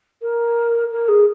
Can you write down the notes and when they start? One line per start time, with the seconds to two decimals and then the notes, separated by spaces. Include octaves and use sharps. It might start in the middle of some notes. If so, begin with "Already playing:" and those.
0.22 A#4
0.91 A#4
1.08 G#4